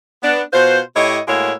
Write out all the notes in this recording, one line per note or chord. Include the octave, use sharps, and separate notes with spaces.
B3 D4
B2 F4 B4 C5
A2 E4 G4 C#5 D#5
A2 G#3 A#3 E4 F#4 C#5